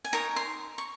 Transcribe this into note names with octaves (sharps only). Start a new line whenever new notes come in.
G#5
D#4 A#4 C#5 A#5
C6
C#6